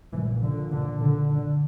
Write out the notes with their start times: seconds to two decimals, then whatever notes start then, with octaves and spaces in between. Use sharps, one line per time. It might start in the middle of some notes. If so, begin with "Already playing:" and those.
0.14 A#1 A#2 E3
0.43 D3
0.72 D3
1.01 D3
1.29 D3